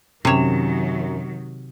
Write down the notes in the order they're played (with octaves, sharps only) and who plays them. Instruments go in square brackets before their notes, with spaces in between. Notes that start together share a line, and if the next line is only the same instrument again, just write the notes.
[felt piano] F#2 E7 [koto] C3 C#5 [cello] D#3 F#3